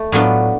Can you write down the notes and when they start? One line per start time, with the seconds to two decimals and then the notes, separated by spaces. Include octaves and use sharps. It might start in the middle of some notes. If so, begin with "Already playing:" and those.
Already playing: A3
0.12 A2 F#3 B3 D4 F4